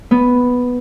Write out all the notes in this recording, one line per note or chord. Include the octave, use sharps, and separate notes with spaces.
B3